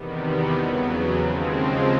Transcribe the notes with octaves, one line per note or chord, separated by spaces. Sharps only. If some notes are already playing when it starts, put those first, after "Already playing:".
Already playing: E2 C3 D#3 G3 B3
E2 C#3 F#3
D#2 C#3 F3 G#3 C4